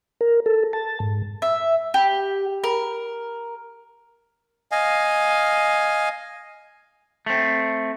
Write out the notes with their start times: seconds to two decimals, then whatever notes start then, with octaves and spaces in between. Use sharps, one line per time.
0.21 A#4
0.46 A4
0.73 A5
1.00 G#2
1.42 E5
1.94 G4
2.64 A#4
4.72 D#5 F5 G#5
7.26 A3 C4